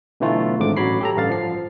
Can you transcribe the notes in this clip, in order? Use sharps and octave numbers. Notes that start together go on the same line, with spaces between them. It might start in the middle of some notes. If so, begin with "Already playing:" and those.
B2 D3 E3 F#3 A3 F4
G#1 G#2 D3 D6
A1 F#3 F#4 C#5 B5 C7
G4 A4 A#5
A1 G2 D3 F5 A6
F3 C7